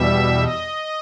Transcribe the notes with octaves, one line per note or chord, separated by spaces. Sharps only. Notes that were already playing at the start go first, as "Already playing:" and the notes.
Already playing: E2 B2 G3 E5
D#5